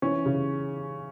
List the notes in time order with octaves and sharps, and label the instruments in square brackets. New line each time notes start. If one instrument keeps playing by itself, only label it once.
[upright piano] E3 C#4
C#3